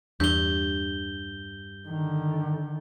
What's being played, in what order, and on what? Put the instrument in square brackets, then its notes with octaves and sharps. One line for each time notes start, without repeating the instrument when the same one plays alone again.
[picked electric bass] E2 [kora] G2 [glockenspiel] G6 G7
[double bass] D3 D#3